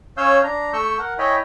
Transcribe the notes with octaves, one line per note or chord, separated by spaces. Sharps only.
C#4 C#5 F5 G#5 E6 G6
D4 A#5
A3 C#6 E6 G6
A#4 F#5
E4 C#5 D#5 G5 G#5 B5